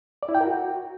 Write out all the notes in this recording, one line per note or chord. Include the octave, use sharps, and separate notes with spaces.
D5
E4
G5
A#4
F#4